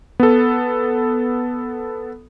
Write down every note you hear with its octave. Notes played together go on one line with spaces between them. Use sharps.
B3 A4